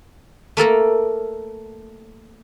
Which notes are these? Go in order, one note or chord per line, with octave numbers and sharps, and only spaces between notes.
A3 A#3 A4 A#4